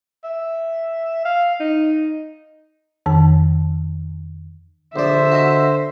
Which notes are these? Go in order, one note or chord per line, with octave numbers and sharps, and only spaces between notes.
E5
F5
D#4
F2 D#3 A5
A#1 D3 C5 D5 E5
F#4 D#5